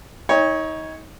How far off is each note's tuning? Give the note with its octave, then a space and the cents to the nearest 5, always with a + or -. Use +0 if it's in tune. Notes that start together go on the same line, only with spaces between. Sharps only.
D#4 +30 C#5 +0 G5 +40